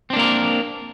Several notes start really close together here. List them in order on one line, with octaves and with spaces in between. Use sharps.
C4 D4 A#3 A#4